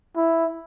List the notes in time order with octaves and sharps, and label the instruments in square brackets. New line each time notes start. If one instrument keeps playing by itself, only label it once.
[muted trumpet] E4